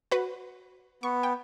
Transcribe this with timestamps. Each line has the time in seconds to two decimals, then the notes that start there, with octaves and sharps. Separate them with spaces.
0.11 F#4 B4
1.03 B3 C#6
1.23 G5